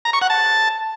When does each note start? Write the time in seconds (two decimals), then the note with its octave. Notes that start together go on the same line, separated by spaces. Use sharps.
0.05 A#5
0.13 C#6
0.22 F#5
0.30 A5